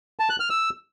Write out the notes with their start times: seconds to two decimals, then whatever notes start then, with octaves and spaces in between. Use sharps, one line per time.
0.19 A5
0.30 F#6
0.40 F6
0.50 E6